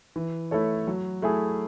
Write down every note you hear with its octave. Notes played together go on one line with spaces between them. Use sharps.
E3
A3 E4 A4 C#5
F#3
A3 E4 G#4